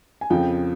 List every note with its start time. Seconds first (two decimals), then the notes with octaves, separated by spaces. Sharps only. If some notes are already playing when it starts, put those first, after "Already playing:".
0.21 G#5
0.30 F2 C#3 F3 G5